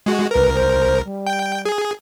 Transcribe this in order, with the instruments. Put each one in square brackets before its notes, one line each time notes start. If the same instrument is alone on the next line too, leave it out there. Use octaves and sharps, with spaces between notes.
[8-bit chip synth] G#3 F#4
[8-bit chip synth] C2 A#4 [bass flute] B4
[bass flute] C5
G3
[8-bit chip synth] G5
G#4